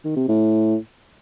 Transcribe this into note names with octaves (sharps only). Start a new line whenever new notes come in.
D#3
C3
A2